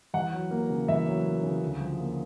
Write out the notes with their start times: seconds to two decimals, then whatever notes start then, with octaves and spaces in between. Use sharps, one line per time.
0.14 E2 F#5
0.33 F#3
0.51 A#3
0.70 C#3
0.88 E2 E5
1.07 F#3
1.25 A#3
1.43 C#3
1.62 D2
1.80 F3
1.99 A#3